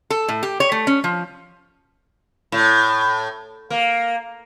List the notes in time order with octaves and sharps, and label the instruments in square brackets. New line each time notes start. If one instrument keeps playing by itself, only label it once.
[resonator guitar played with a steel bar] A4
A2
G4
C#5
A3
C#4
F3
[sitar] A2
A#3